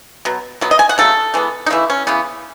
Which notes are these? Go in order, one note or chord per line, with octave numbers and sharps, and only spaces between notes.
B2 F#3
B2 F#3 B3
D#5
G#5
F#5
C#3 F#3 A3 A4
E3 G#3 B3
D#4
C#3 E3 A3 E4
C#4
C#3 E3 B3